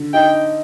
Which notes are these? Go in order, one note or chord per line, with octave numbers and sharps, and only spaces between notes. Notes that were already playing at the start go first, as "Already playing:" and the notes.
Already playing: D3
D#4 G5